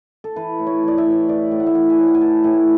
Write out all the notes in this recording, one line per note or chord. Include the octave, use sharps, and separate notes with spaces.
A4
E3 B4
A2
C#5
E3 D5
E5
A2
E3 D5
A2
F#5
E5
E3 F#5
G#5
A2
F#5
G#5
E3 A5
A2 G#5